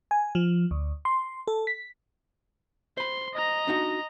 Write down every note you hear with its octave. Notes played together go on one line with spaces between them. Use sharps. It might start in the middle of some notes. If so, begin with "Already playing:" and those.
G#5
F3
D2
C6
A4
B6
C5 B5 C6
D#5 A#5
D4 D#4 F#4